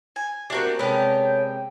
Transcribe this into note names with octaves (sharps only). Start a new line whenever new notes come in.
G#5
A3 A#3 C4 D4 F#4 G4 A#4
C3 G#3 B3 C#4 D4 A#4 G5 A5